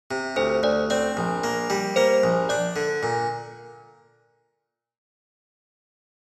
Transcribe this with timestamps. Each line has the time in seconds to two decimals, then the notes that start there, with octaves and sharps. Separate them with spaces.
0.11 C3
0.36 D2 C5
0.63 D2 D5
0.90 C4 D5
1.17 A#1
1.44 A#3
1.70 G3
1.96 A#3 C5
2.23 A#1
2.49 D4 D5
2.76 D3
3.03 A#2